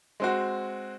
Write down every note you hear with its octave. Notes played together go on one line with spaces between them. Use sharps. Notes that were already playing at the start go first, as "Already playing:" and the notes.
G#3 C4 F#4